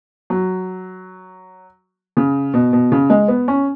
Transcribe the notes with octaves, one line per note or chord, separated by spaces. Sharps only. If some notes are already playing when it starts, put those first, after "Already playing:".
F#3
C#3
B2
B2
C#3
G#3
B3
C#4